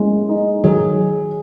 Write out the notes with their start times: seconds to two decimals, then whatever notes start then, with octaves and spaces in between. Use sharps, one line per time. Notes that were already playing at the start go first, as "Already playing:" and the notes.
Already playing: G#3 A#3 C#4 E4
0.29 D#4
0.64 D#3 F#3 G#4